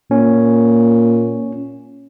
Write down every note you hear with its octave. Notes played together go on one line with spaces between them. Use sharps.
A#2 C#4